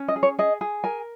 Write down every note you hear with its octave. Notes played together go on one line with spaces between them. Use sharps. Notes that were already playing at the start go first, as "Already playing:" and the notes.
Already playing: C#4
D#5
G#4
C#5
G#4 D#5
G#4
A#4 G#5